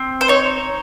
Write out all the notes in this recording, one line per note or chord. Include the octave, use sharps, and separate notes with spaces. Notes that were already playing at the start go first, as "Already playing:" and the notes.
Already playing: C4
C5
D#4 C#5